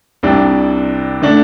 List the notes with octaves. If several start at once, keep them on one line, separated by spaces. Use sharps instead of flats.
C2 C3 G3 D4
D3 A3 D4